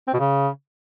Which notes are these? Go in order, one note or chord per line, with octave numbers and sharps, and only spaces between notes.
C4
B2
C#3